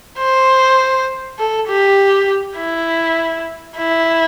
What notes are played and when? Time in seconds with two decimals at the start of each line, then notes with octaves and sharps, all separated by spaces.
0.19 C5
1.39 A4
1.68 G4
2.57 E4
3.77 E4